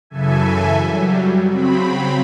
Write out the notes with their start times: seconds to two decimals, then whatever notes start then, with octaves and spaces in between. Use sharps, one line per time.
0.10 F#2 C#3 E3 A4 E5 G#5
0.84 F#3 G3
1.49 C#3 F#3 C4 B5